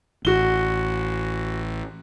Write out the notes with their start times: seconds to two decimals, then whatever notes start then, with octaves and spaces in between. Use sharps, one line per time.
0.25 A1 F#4 G7